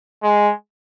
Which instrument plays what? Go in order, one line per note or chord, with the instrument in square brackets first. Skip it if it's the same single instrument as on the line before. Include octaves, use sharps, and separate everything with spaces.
[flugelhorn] G#3